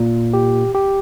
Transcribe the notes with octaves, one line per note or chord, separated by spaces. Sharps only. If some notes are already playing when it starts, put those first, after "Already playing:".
Already playing: A#2
G4
G4